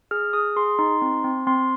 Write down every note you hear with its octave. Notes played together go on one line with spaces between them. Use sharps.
G#4 F6
G#4 D#6
G#4 C6
D#4 C6
C4
C4
C4 C6